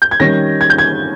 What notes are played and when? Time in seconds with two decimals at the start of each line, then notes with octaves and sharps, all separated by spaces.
0.02 G6
0.11 G#6
0.20 D#3 G3 C#4 A#6
0.61 G#6
0.70 G6
0.78 G#6